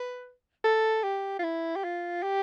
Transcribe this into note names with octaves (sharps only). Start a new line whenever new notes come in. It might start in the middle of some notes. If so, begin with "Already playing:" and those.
Already playing: B4
A4
G4
F4
E4
G4
F4
G4